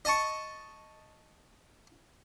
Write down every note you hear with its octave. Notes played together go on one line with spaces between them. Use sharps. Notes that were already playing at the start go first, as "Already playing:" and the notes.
D#5 A5 C#6